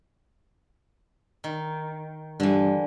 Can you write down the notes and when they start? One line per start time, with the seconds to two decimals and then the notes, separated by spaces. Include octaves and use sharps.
1.44 D#3
2.40 G2 D3 E3